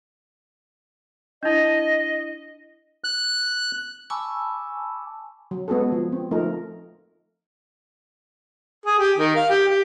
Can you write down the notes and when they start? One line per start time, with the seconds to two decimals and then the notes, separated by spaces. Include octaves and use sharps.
1.43 D4 E4 D#5
3.04 F#6
4.10 G#5 A5 B5 C#6 D6 E6
5.51 F#3
5.68 G#3 B3 F#4 G#4 A4
5.92 F3
6.12 C4
6.31 F3 A3 D#4 A#4
8.86 G#4
8.99 G4
9.18 D#3
9.36 F5
9.50 G4
9.69 G4